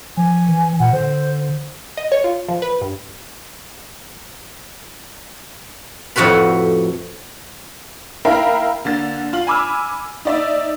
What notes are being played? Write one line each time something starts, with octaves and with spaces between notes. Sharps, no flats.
F3 G#5
E3
A#2 F#5
D3 C5
D#5
C#5
F4
F3
B4
G2
F2 A2 F#4 B4 B5
E4 A#4 F5 G5 A#5 B5
D3 A#3 A6
F4 F#7
G#5 B5 D6 E6 F6
D#4 D5 E5